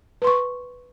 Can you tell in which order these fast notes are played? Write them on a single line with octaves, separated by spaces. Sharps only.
B4 C6 C#6